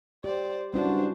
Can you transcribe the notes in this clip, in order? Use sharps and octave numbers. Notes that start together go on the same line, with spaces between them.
G4 C5 D5
G2 C#4 D4 E4 F#4 C5